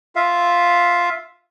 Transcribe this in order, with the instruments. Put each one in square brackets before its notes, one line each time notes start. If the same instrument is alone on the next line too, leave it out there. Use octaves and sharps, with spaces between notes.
[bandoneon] F4 E5 F5